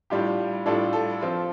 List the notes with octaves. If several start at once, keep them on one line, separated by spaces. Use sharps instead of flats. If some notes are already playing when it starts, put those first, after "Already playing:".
A2 G3 D4 F4 G4
A2 G3 D4 F4 A4
A4
F3 C4 F4